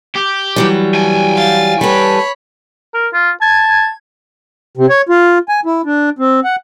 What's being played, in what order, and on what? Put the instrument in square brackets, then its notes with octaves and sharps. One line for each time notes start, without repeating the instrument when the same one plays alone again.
[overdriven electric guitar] G4
[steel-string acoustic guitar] E3 F#3 G3
[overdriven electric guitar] G5 G#5
[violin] F5 A6
[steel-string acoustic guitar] G3 A4 B4 [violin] C#5 B5
[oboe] A#4
F4
[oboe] A5 [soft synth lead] G#6
[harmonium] C3
C#5
F4
G#5
E4
D4
C4
F#5